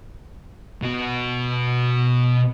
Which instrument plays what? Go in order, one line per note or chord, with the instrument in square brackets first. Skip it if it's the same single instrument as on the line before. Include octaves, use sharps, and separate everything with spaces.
[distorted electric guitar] B2 F#4